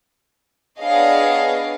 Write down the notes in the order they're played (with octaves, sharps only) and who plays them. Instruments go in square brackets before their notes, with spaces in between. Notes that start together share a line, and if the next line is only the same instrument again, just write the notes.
[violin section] B3 D4 G#4 C#5 D#5 F5